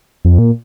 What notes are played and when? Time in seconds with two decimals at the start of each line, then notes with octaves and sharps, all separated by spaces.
0.25 F2
0.38 A#2